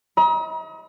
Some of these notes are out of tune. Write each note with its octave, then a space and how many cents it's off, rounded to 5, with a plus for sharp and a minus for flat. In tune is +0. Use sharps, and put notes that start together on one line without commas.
D#5 +40 A#5 +40